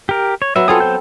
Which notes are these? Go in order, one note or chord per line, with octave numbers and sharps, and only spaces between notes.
G4 A#4
C#5
F#3 B3 E5
B3 C4 F4 A4 G#5 D#6
F#3 C5 G6